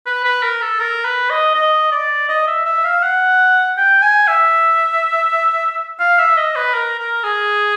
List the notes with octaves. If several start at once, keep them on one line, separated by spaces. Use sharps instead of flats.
B4
B4
A#4
A4
A#4
B4
D#5
D#5
D5
D#5
E5
E5
F5
F#5
G5
G#5
E5
F5
E5
D#5
B4
A#4
A#4
G#4